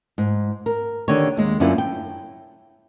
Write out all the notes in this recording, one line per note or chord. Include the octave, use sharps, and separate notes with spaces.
G#2
A#4
D3 D#3 G4 C#5
D#2 G#3
F#2 D3 A#3 C#4 E4 F4
G5